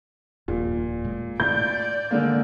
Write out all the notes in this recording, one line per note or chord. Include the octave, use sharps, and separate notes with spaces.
D#1 F2 A#2
A2 G#3
A2 A3 D5 G6
D3 G#3 A#3